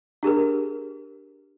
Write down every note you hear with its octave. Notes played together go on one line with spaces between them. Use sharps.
D4 G4 G#4 A#4